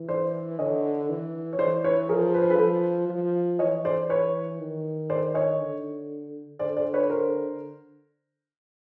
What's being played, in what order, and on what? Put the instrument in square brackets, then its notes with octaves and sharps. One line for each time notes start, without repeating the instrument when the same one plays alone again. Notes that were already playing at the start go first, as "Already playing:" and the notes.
Already playing: [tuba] E3
[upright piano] C5 D5
[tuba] D3 [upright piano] C#5 D#5
[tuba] E3
[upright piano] C#5
[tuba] E3 [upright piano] C5 D5
[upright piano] B4 C#5
[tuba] F3 [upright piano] G#4 A#4
[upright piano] B4
C5
A4 B4
[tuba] F3
F3
[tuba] E3 [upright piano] C#5 D#5
[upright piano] C5 D5
B4 C#5
[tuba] D#3
[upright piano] C5 D5
C#5 D#5
[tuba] D3
[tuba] D3 [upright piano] C5 D5
[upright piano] C5 D5
B4 C#5
A#4 C5